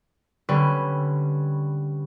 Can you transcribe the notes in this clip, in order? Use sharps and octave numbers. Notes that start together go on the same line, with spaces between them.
D3 G3 C#4 B4